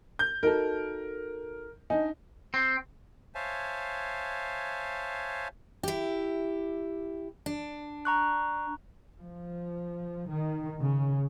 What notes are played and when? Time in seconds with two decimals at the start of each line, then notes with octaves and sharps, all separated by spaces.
0.19 G6
0.43 D#4 F#4 A4 A#4
1.90 D4 D#4 D#5 G#5
2.54 C4
3.35 C5 C#5 E5 F5 G#5 A5
5.83 E4 G4
7.46 D4
8.05 A#5 C#6 F#6
9.19 F3
10.29 D#3
10.81 C#3